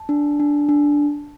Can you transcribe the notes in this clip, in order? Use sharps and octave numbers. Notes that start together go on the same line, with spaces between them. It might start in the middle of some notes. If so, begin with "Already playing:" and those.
Already playing: A5
D4
D4
D4